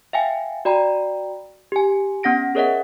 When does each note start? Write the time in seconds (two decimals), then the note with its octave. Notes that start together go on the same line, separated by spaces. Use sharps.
0.13 E5 F5 G5 G#5
0.65 F#4 D5 G5 A#5 B5
1.72 G4 G#5
2.23 B3 C#4 F#5 A#6 D7
2.55 G#4 A#4 C#5 D#5 E5 F#5